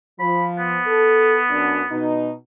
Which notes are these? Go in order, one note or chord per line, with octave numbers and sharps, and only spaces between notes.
F3 B5
B3
A4
F#2 D4
B2 D#4